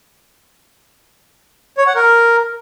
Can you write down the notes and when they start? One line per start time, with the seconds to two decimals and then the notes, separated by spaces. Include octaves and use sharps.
1.78 C#5
1.86 F#5
1.95 A#4